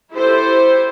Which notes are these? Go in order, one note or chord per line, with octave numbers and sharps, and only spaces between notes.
E4 G4 A4 C5